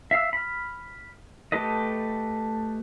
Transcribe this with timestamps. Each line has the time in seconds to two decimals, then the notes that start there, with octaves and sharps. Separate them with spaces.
0.11 E5 F5 E6
0.33 B5 F6
1.52 A3 G4 A4 B4 D#5